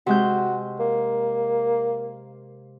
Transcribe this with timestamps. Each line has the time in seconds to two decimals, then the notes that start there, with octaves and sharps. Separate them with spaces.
0.07 C3 G#3 F#4 G6
0.80 A#3